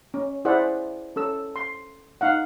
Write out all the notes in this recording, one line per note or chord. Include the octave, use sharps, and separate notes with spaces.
C#4
E4 G#4 C5 D5 E5 F#5
C#4 A4 E6
C6
D#4 F5 F#5